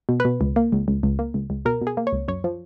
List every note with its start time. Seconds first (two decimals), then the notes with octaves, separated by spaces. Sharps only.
0.09 B2
0.20 B4
0.25 B2
0.41 C#2
0.56 A#3
0.72 C#2
0.88 C#2
1.03 C#2
1.19 A#3
1.34 C#2
1.50 C#2
1.65 B2 A#4
1.81 B2
1.87 G#4
1.97 A#3
2.07 C#5
2.12 C#2
2.28 F#2 C#5
2.44 F3